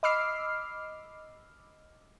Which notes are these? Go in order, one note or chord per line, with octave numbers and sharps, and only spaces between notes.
D#5 B5 D6 E6 F6 C7